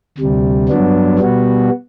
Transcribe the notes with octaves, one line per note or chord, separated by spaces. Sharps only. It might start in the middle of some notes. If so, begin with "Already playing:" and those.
D2 C3 G3
G2 F#3 B3 D4
B2 G3 B3 F#4